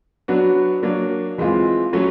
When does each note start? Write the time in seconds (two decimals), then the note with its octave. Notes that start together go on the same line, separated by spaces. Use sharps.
0.28 F#3 B3 D4 F#4
0.83 F#3 A#3 D4
1.38 E3 G#3 C4 F4
1.93 F#3 A3 C#4 F#4